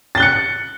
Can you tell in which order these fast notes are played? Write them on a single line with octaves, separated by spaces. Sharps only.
A6 G7 F#6 C#7